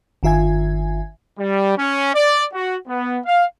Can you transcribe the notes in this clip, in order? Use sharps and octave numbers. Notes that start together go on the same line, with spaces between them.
G1 D#3 F4 E5 G#5 G#6
G3
C#4
D5
F#4
B3
F5